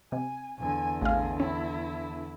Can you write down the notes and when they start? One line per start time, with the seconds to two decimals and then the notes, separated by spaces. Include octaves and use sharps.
0.12 C3 G#5
0.58 E2 D3 G#5
1.02 A1 G#4 F5
1.40 C#4 E4